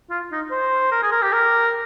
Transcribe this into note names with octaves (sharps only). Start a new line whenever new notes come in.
F4
D#4
C5
A#4
G#4
A#4
G4
A#4